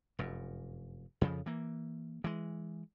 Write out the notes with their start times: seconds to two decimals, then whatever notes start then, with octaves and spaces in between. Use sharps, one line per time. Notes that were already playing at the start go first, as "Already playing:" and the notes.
0.19 F1 F#2
1.21 F2 C#3 F3
1.46 E3 A#3
2.24 E3 G#3